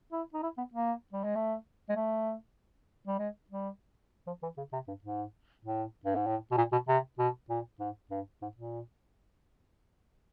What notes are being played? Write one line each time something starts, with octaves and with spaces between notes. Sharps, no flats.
E4
D#4
E4
B3
A#3
G3
G#3
A3
G#3
A3
G3
G#3
G3
F3
E3
C#3
C3
G2
G#2
A2
G2
G#2
A2
B2
A#2
B2
C3
B2
A#2
G#2
G2
G#2
A#2